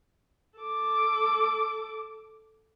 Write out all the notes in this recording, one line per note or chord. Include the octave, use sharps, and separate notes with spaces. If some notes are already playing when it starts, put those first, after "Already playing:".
A4 D6